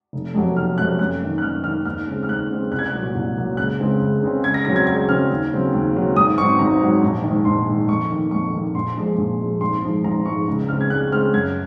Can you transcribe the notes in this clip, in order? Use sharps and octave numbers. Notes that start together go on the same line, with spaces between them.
F1
F2 C3 F#3 A#3
F1 F6
F2 C3 F#3 A#3 F#6
F#2 F#6
D#3 A#3
F#6
F#2 F6
D#3 A#3 F6
D#2 F6
C#3 G#3 C4
F6
D#2 F#6
C#3 G#3 C4
C2 F#6
G#6
F#6
A#2 F#3 A#3
C2
A#2 F#3 A#3
C#2 F#6
C#3 G#3 C4
C#2
C#3 G#3 C4
C#2 G#6
A#6
C#3 F#3 C4 A#6
G#6
C#2 G#6
C#3 F#3 C4 F6
D#2
C#3 F#3 C4
D#2
C#3 F#3 C4
G#1 D#6
G#2 F#3 C4 C#6
G#1 A#5
G#2 F#3 C4
A#1
G#2 D#3
A#1 C6
G#2 D#3
F2 C#6
D#3 A#3
F2 C#6
D#3 A#3
A#1 C6
A#2 F3 G#3
A#1
A#2 F3 G#3
G#1 C6
G#2 F3 G#3
G#1 A#5
G#2 F3 G#3 C#6
C#2
C#3 G#3 C4 F6
G#6
C#2 F#6
C#3 G#3 C4 F6
F#2 G#6